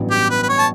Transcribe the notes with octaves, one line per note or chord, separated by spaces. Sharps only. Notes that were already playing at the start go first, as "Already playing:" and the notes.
Already playing: A1 G2 F#3 B3
G4
B4
B4
C#5
A5